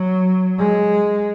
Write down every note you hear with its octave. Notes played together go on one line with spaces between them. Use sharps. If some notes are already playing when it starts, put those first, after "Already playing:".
Already playing: F#3
G#3